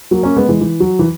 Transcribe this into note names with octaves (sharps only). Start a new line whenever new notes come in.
F#3 A#3
A#3 C#4
G#3 B3
E3 G#3
E3
F#3
E3